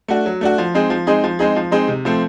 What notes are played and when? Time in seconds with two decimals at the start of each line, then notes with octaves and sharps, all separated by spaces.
0.08 A3 D4 F#4
0.26 F#3
0.41 A3 D4 F#4
0.58 F3
0.75 G#3 C4 D#4 G#4
0.90 F3
1.07 G#3 C4 D#4 G#4
1.24 F3
1.39 G#3 C4 D#4 G#4
1.56 F3
1.71 G#3 C4 D#4 G#4
1.88 C3
2.05 F3 A3 C4